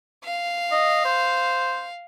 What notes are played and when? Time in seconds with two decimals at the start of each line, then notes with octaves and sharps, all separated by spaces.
0.24 F5
0.72 D#5
1.05 C5